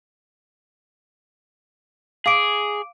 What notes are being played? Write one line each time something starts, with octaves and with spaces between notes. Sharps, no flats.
G#4 F5 D6 D7